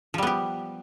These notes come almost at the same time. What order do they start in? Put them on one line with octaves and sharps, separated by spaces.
F3 G3 B3 G4